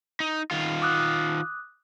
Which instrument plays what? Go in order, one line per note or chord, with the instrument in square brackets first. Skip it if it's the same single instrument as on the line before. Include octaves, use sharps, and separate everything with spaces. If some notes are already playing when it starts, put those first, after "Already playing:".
[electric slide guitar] D#4
D#3 F4
[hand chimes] D6 D#6 F#6